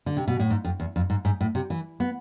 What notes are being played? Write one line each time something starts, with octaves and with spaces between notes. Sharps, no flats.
D3
C3
B2
A2
G#2
F2
E2
F2
G#2
G#2
A2
C3
E3
B3